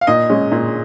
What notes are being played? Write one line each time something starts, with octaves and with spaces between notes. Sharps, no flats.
F5
A#2 D#5
G#3 C#4
A#2